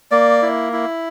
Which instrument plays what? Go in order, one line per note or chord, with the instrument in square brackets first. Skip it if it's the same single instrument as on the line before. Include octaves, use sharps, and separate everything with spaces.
[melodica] A#3 D5
E4
E4